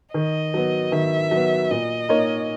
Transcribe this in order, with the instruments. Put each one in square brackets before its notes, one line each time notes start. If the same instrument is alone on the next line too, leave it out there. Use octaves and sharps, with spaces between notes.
[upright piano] D#3 [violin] D#5
[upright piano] F#3 B3
[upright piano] D#3 [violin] E5
[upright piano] F#3 B3
[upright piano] A#2 [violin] D#5
[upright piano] A#3 D#4 A#4 C#5